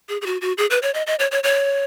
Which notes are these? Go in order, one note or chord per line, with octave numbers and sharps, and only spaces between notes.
G#4
G#4
F#4
F#4
G#4
B4
C#5
D#5
D#5
C#5
C#5
C#5